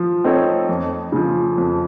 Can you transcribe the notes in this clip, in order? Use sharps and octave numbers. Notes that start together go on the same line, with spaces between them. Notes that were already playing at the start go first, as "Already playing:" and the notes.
Already playing: F3
C4 D#4 A4 C#5
F2
C#3 F3
F2